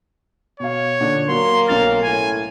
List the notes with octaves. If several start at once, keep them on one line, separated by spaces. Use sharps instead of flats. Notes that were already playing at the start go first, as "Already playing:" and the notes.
B2 C#5 F5
A#2 D3 D4
F#3 A#3 C6
B1 C#4 F5 A6
A2 G#5